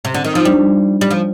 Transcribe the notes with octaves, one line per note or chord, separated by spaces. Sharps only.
C3
D3
D#3
F3 D#4
G3 D4
G3
F3